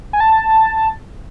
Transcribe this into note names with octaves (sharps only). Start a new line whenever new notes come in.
G#5
A5